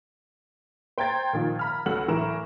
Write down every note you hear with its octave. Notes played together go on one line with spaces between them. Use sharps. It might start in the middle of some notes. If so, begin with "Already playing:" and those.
C5 G5 A#5 G#6 A6
A#2 D#3 F3
A#5 B5 F6
C#2 F#3 A4 F#5 F6 F#7
A2 E3 A#4 E7